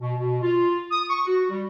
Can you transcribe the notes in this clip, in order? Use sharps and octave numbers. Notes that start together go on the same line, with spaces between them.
B2
B2
F4
D#6
C#6
F#4
G3